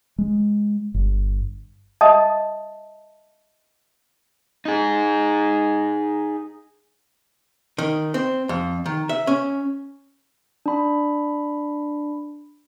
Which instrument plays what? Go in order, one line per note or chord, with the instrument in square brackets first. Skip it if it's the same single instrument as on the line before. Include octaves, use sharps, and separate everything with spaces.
[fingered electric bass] G#3
G1
[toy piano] D#5 E5 A5 D#6
[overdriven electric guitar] D#4 G#4
[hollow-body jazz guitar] D#3
C4
F2
D#3
E5
C#4
[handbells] D4 B5